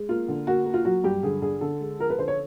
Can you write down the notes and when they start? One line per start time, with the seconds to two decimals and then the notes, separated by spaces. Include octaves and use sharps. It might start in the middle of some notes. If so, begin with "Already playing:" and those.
Already playing: G#3
0.09 A#3 F4
0.28 D3
0.47 A#3 F#4
0.66 A#3
0.74 F4
0.85 F#3 F#4
1.04 G2 G4
1.23 D3 G#4
1.42 D3 G#4
1.61 D3 A4
1.80 G#3
1.99 F3 A#4
2.10 B4
2.18 D3 C5
2.28 C#5